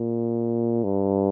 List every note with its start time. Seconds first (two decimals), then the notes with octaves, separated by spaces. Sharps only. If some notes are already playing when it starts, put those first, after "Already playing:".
Already playing: A#2
0.84 G2